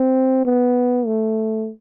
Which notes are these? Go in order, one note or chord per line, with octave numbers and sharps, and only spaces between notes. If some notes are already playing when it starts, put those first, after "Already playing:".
Already playing: C4
B3
A3